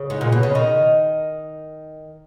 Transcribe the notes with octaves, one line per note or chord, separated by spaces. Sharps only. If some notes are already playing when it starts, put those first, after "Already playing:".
Already playing: C#3
G#2
A#2
B2
C#3
D#3